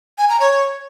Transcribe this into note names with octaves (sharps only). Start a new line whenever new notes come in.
G#5
A#5
C#5